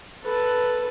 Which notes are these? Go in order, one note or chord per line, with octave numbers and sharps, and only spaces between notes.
A4 B4